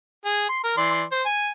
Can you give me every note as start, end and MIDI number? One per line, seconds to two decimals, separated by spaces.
0.25 0.46 68
0.49 0.60 84
0.64 0.76 70
0.77 1.04 52
0.77 1.04 74
0.77 1.04 84
1.12 1.23 72
1.26 1.50 80